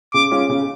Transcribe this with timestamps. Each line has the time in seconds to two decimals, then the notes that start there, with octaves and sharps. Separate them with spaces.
0.14 C#3 D6
0.31 G#3 C#4 F4
0.49 C#3